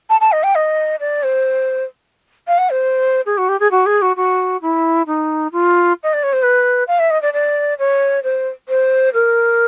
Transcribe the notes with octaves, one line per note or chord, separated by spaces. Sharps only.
A5
A5
D#5
G5
D#5
D5
C5
F5
F#5
C5
G#4
F#4
G4
G#4
F#4
G#4
F#4
F#4
E4
D#4
F4
D#5
D5
C#5
C5
B4
F5
E5
D#5
D5
D5
C#5
C5
C5
A#4